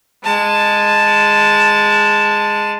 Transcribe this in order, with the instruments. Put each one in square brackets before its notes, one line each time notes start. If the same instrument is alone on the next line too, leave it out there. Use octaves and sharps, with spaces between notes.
[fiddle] G#3 A5